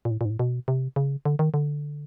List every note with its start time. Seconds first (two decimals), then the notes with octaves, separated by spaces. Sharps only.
0.05 A#2
0.11 A2
0.21 A#2
0.25 G#2
0.30 A2
0.39 B2
0.68 C3
0.96 C#3
1.25 D3
1.39 D#3
1.54 D3